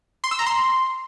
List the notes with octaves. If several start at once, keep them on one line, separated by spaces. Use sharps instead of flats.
C6
E6
A#5
C6